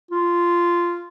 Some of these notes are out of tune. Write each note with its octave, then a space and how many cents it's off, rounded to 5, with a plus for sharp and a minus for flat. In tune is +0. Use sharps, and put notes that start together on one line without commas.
F4 -10